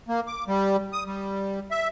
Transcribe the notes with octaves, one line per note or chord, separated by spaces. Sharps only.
A#3
D6
G3
D#6
G3
E5